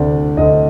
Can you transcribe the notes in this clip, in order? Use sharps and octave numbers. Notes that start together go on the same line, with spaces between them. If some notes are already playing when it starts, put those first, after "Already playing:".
Already playing: D2 C3 D5
D2 D#5